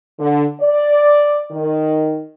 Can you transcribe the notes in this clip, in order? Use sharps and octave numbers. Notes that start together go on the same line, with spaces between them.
D3
D5
D#3